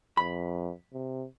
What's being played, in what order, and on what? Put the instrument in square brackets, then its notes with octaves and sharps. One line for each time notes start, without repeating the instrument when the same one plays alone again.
[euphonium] F2 [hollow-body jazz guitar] B5
[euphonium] C3